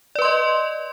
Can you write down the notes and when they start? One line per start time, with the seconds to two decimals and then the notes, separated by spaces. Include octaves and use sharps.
0.15 D5
0.19 B4
0.22 C6
0.25 D#5